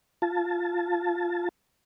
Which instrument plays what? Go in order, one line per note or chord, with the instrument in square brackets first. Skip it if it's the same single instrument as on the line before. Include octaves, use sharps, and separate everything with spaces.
[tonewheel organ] F4 A5